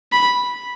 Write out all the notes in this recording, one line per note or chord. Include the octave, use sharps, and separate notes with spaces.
B5